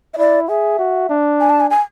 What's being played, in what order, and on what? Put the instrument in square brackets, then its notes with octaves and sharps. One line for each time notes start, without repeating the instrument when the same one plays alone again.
[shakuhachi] E5
[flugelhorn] E4 [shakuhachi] D5
[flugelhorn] G#4 [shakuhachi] E5
[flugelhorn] F#4
D4
[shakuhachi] G#5
A5
G#5
G#5